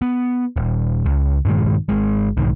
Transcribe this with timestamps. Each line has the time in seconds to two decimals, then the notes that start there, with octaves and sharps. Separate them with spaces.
0.02 B3
0.56 D#1
1.06 C#2
1.45 G2 A#2 D#3 G#3
1.89 G#1 G#3
2.37 B1 G#2 D#3